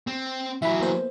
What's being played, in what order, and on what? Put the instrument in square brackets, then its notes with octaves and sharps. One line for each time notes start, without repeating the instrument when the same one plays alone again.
[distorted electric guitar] C4
[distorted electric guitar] E3 F#3 [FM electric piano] E5 B5
[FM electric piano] A#3 B3 C5